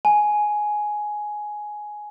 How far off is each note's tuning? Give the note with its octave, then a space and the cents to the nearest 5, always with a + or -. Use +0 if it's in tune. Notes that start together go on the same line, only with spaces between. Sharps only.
G#5 +10